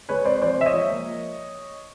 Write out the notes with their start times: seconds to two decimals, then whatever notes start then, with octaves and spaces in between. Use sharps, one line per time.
0.09 G#3 B4 C#5
0.25 C4 C5 D5
0.42 F3 C5 D5
0.58 G#3 E5
0.66 C#5 D#5
0.74 F3
0.90 A#3